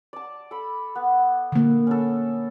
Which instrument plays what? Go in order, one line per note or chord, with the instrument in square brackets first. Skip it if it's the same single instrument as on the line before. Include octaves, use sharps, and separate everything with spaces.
[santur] D5 A5
A4 B5
B3
[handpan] D3 A#3
[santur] C#4 A4